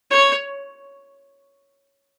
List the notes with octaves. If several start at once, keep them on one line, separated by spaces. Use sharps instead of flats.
C#5